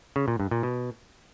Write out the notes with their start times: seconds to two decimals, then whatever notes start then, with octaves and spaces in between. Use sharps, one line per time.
0.16 C#3
0.28 A#2
0.40 G2
0.51 A#2
0.63 B2